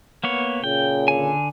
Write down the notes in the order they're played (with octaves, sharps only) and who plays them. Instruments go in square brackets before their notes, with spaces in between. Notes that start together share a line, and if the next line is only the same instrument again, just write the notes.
[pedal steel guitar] A#3 B3 C#5
[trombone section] A#2 C#3 [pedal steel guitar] G5
[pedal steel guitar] D3 G#5